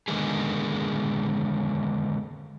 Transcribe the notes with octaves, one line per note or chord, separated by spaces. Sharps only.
D3 D#3 G#3 A#3 B3 G#4